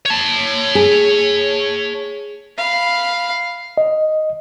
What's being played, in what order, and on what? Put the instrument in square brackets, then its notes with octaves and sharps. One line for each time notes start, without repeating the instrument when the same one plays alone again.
[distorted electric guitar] C#5 A5
[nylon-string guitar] G#4
[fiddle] F5 B5
[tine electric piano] D#5